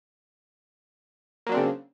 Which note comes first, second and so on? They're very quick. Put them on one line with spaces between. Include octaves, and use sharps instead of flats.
A#3 F#3 D4 C4 C#3